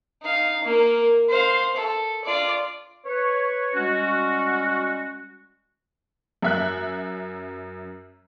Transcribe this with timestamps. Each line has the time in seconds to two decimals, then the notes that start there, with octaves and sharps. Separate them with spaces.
0.23 D#4 F5
0.64 A#3 A#4
1.29 C5 F5
1.76 A4
2.24 F4 D5
3.06 B4 C#5
3.74 G3 G#3 C#4 F#4
6.42 F#2 E5 F#6